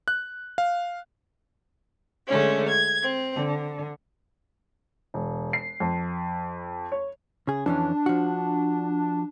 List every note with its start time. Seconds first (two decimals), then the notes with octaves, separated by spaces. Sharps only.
0.08 F#6
0.58 F5
2.27 D3 G#3 A3 C#4
2.69 G#6
3.02 C4
3.36 D3
5.14 E1
5.53 C7
5.80 F2
6.92 C#5
7.47 C#3 G#4
7.66 F2 E3 C#4 D4
8.06 F3 F#4